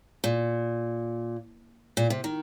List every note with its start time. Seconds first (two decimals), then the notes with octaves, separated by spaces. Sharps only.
0.24 A#2
1.97 A#2
2.10 C3
2.24 D#3